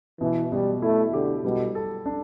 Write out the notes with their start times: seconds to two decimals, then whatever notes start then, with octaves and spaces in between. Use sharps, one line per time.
0.21 B2 E3
0.52 B2 G3
0.82 A3 E4
1.13 D3 G4
1.44 B2 G3
1.75 A4
2.06 D4